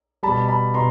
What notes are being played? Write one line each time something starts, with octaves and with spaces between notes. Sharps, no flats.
B2 G3 A5 B5
A5 B5
B2 A#5 C6